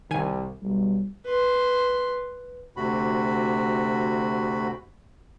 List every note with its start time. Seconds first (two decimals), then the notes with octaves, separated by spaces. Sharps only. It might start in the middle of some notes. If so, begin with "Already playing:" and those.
0.11 C2 D#3 G#5
0.62 B1 G3
1.25 B4 C6
2.77 D2 C3 F#4 B5